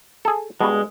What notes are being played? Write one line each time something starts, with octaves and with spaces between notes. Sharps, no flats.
G#4 A4
G2 B2 G#3